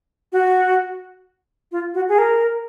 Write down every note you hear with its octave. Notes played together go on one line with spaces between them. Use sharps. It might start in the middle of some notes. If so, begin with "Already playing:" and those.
F#4
F4
F#4
G#4
A#4